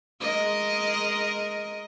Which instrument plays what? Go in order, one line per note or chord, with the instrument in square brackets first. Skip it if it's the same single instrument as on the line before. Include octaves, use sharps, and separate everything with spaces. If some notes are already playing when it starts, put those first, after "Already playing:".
[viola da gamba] G#3 A#4 D#5